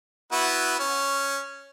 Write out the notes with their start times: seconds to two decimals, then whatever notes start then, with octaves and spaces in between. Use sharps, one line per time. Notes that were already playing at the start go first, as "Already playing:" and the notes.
0.32 B3 E4 F#4
0.79 C#4